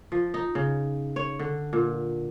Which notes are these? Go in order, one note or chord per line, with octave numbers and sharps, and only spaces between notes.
F3
D#4
C#3
C#5
D3
A#2